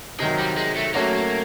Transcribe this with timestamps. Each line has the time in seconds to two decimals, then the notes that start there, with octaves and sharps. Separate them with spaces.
0.20 C3 D#3 F#3 G#3
0.39 G3
0.57 G#3
0.76 A3
0.94 F#3 A3 A#3 C#4 F#4